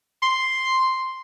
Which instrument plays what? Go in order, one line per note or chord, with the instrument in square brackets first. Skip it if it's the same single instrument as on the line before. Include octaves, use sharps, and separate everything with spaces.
[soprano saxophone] C6